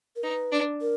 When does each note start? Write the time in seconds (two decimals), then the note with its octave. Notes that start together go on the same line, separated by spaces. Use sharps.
0.16 A#4
0.23 D#4 B4
0.52 D4
0.81 A#4